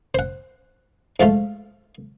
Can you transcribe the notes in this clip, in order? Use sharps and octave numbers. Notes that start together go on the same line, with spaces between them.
C5 F#5
G#2 F3 A3 F4